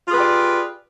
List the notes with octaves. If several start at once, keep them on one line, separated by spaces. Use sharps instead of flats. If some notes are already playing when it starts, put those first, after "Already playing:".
F4 G4 G#4 B4 D5